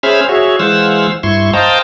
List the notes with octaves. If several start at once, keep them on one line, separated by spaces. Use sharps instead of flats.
C#4 G#4 C5 E5 B5 F6
F#4 G#4 C#5 E5
E3 G#3 C5 F5 F#5 E6
G2 E4 C6 C#6
C5 D#5 F5 G5 A5 A#5